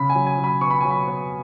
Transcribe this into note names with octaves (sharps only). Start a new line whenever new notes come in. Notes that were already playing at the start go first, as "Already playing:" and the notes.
Already playing: C#3 B5
G#5
F#3
G#5
F#3
B5
B3 C#6
B5
F#3 G#5
B5
B3